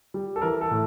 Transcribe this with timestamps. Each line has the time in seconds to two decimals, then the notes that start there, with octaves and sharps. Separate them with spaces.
0.14 G3
0.36 A4
0.42 E3 A#4
0.61 A4
0.71 A2